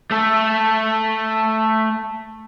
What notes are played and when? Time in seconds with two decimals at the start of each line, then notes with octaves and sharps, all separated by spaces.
0.11 A3 A4